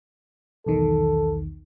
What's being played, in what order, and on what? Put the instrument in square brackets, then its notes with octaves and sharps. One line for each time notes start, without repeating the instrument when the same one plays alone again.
[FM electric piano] B1 E2 D#3 [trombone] A4